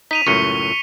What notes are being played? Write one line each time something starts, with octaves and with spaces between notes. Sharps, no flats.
D#4 B6 D#7 F7
C#2 F#2 A2 C#6 C#7 G7